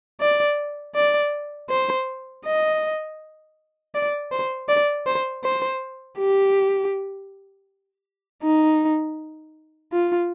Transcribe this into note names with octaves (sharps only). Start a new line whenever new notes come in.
D5
D5
C5
D#5
D5
C5
D5
C5
C5
G4
D#4
F4